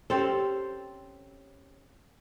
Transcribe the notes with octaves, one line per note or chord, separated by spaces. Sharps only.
C4 C#4 G4 A4 C5